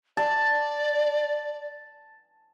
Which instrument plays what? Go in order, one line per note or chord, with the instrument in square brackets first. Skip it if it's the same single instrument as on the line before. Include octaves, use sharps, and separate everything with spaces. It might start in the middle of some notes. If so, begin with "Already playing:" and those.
[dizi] D5 [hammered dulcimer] A5